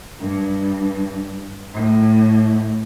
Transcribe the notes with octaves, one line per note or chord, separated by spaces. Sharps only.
G2
A2